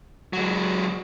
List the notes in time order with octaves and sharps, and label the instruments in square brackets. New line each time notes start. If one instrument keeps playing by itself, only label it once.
[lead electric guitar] F#3 G#3